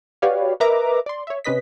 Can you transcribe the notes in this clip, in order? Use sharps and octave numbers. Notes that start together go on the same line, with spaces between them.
F#4 G4 B4 C#5 D5 F5
A#4 B4 D#5 E5 A#5 D6
D5 C6
C#5 E5
C3 C#4 B4 D#5 B6